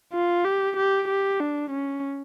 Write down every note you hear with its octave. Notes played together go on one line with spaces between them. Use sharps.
F4
G4
G4
G4
D4
C#4